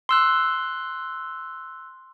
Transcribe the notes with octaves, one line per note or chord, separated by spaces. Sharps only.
C6 E6 F#6